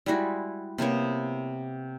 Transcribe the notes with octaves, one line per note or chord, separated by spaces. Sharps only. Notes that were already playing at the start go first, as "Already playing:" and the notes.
G3 G#3 E4 F#4
C3 A#3 B3 C#5